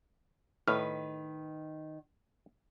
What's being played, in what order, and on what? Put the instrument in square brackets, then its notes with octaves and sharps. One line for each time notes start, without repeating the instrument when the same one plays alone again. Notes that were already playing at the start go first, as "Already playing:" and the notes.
[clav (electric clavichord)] A2 [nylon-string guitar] D#3 B4 [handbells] F6